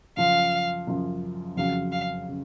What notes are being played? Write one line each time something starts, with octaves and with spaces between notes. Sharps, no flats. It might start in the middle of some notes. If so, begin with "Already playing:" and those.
F#2 C#3 F3 F5
F#2 C#3 F3
F2 C#3 F#3 F5
F5
C#3